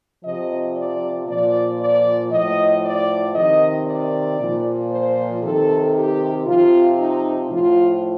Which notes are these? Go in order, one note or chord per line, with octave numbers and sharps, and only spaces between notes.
C3 F3 D#5
D5
A#2 D5
F3
D5
A2 F3 D#5
D5
C3 D#3 D#5
D5
A#2 F3
C5
C3 D#3 A4
G4
C3 F3 F4
D#4
A2 F3 F4